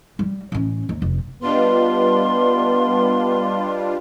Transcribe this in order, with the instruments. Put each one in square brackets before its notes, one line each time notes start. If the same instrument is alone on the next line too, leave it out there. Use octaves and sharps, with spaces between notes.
[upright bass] G3
A1 C#4
D#2
F1
[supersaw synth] G3 D4 F4 [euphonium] B3 [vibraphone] B4 D#5 [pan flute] C6